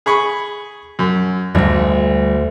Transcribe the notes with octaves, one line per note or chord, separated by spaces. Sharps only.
G#4 B5 C#6
F#2
G#1 D2 G2 G3